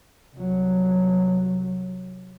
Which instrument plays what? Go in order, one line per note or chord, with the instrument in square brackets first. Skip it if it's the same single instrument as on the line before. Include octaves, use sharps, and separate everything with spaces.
[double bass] C2 F#3